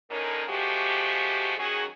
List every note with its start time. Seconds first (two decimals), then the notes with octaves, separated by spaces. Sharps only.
0.11 A2 D3 C#4 D#4 A#4
0.48 F3 G#3 A3 F#4 G4
1.58 D#3 F#3 C#4 F#4 G#4